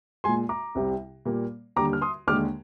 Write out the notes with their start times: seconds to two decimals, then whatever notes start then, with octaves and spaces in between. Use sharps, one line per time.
0.24 A#2 G#3 G#5 C6
0.49 A#5 D6
0.75 C2 C3 G3
1.25 A#2 G3 A#3
1.76 D#2 D3 G3 A#5 D6
1.93 F6
2.02 C6 D#6
2.27 D#2 D3 G#3 D6 F6